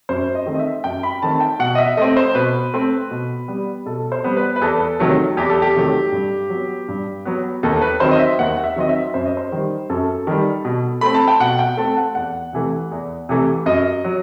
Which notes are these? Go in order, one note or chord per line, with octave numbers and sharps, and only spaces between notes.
F#2 C5
D#5
D#3 A3 C4
D#5
E5
F#2 G5
B5
D#3 A3 C4 A5
G5
B2 F#5
D#5
E5
A3 C4 D#5
C5
B2 B4
A3 C4
B2
G3 B3
B2 A4
C5
G3 B3
B4
B4
E2 A4
C3 D#3 F#3 A3
E2 G4
A4
G4
C3 D#3 F#3 A3
G2
F#3
B3
G2
F#3 B3
D#2 A4
B4
D#3 F#3 C4 C5
D#5
E5
D#2 F#5
E5
D#3 F#3 C4 D#5
E5
F#2 C5
D#5
C5
D#3 G3
F#2 A4
D#3 G3
B2
A3 C4 B5
A5
G5
B2 F#5
G5
A3 C4 A5
F#5
E2 F#5
C3 E3 A3
E2
C3 E3 A3
F#2 D#5
F#3